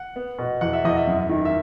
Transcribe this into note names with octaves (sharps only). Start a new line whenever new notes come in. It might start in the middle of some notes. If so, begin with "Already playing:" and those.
Already playing: F#5
B3
B2
E2 F#5
E5
E2 D#5
E5
F#2
D#3
E5